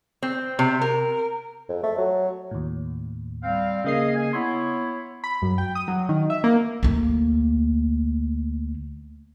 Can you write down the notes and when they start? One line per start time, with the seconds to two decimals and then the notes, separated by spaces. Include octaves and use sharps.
0.23 C4
0.59 C3
0.82 A#4
1.69 F2
1.83 A3
1.98 F#3
2.51 D#2 A2
3.43 G3 C4 F5
3.84 C#3 A#3 G#4 D#5 F5 C7
4.15 G#4 G#5
4.33 B3 E4 C#5 C6
5.24 B5
5.42 F#2
5.58 G5
5.75 D#6
5.88 F#3
6.09 D#3
6.30 E5
6.44 A#3
6.83 D2 A#3